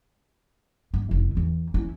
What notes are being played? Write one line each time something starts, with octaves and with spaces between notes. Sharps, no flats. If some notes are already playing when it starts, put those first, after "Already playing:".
G2
F1 E4
E2 E3
C#4 E4